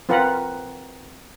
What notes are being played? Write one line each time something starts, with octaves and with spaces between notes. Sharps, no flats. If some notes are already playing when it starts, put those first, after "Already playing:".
C4 F4 A#4 B4 F#5